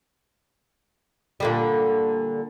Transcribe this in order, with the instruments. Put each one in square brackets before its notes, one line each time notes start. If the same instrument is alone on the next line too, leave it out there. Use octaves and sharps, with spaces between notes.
[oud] A#2 D3 G3